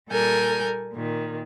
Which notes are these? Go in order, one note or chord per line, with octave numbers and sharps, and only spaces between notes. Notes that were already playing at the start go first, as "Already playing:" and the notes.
A#2 G3 A4 A#4 G#5 G6
A#2 D#3